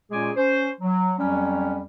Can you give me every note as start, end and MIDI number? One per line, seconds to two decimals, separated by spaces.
0.11 0.30 46
0.11 0.30 56
0.11 0.30 61
0.11 0.30 68
0.11 0.30 80
0.11 0.30 86
0.37 0.69 61
0.37 0.69 72
0.81 1.12 54
1.18 1.82 41
1.18 1.82 54
1.18 1.82 55
1.18 1.82 61